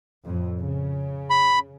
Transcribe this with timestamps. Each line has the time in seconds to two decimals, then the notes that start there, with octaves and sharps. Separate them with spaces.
0.24 F2 A2
0.59 C#3
1.30 B5